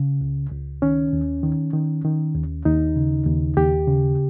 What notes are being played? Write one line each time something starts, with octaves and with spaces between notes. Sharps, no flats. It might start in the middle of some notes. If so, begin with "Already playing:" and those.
Already playing: C#3
C#2
C#2
D#3 C#4
D#2
D#3
D#3
D#3
D#2
D#2 D#4
C#3
D#2
D#2 G4
C#3